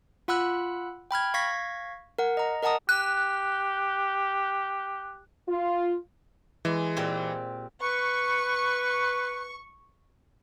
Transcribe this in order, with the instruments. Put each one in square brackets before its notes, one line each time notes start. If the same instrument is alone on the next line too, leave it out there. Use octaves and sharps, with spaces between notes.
[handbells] F4 F#5 B5 E6 F#6
G5 B5 F6 G#6
F5 C#6 G#6 A#6 B6
A#4 F#5
D#5 A#5
A#4 D#5 F#5 A5 A#5 D#6
[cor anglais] G4 [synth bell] F#6
[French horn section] F4
[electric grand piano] E3 [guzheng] G#3
[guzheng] A#2 C4 G4
[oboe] B4 [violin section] C#6